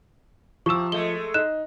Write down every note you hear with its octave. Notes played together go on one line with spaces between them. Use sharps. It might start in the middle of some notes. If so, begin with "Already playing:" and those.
C3 F3 C#6 E6 E7
G#3 A3 G7
D#4 F#6 E7